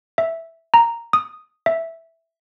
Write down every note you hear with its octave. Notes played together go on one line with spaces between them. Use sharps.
E5
A#5
D#6
E5